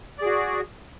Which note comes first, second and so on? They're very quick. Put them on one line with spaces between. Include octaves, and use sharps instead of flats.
D5 G#4 F#4